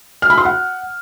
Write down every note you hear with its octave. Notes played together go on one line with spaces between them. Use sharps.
F6
B5
C6
F#5